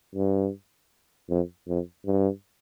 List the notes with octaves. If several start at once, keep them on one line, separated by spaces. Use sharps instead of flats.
G2
F2
F2
G2